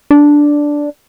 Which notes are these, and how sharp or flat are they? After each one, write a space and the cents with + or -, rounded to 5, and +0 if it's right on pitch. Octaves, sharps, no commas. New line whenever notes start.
D4 -5